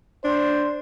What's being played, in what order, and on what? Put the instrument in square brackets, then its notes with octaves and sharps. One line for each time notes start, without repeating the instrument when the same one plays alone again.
[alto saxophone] D4 [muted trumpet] C5